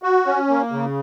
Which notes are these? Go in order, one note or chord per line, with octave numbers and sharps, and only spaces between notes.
F#4
C#4
A#3
C#3